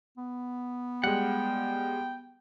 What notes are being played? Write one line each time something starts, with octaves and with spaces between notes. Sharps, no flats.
B3
G3 G#3 F#5 G5